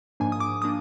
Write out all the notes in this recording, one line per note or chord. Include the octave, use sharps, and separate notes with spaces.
G#2 F3 A#3 D4 G#5
D#6
D6
F3 A#3 D4 D#6